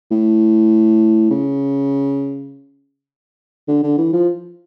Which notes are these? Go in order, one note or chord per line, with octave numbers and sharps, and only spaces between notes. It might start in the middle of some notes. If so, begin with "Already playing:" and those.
A2
C#3
D3
D3
E3
F3